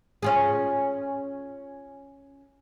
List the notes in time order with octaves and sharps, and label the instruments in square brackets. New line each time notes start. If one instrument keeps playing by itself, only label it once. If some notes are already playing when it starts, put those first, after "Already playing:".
[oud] C#4 F4 G#4